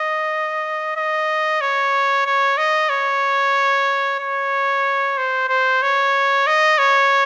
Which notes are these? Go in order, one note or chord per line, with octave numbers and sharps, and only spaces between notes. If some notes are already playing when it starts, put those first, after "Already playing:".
Already playing: D#5
D#5
C#5
C#5
D#5
C#5
C#5
C5
C5
C#5
D#5
C#5